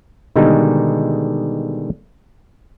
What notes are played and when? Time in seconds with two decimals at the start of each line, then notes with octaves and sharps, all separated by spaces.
0.36 B2 D3 D#3 G3 G#3 D#4